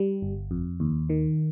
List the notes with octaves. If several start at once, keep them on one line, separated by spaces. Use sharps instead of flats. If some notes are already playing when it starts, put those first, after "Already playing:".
Already playing: G3
G1
F2
D#2
D#3